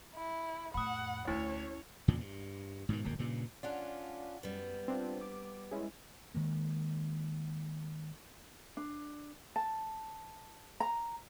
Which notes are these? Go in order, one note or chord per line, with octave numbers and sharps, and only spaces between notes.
E4
F2 A2 F#5 B5 D#6
D2 C#4 D4 E4 C#5
E2 A#2 C#3 F3
G2
G#2 B2 D#3
D1 G1 F2 A#3
G2 A#2 C#3
C#4 D4 F4 D5 F#5
F#2 G3 B3
C4 D4 F4
D6
G#3 C#4 E4
D#3 G#3 A#3
D4
A5
A#5